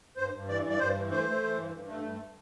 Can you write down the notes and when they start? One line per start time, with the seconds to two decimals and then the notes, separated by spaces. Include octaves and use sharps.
0.17 G2 C5
0.33 G2
0.49 E3 D5
0.64 G2
0.70 D5
0.79 G2 C5
0.95 E3
1.11 A3 C5
1.27 A3
1.42 E3
1.58 G2
1.73 G2
1.88 A3
2.04 G2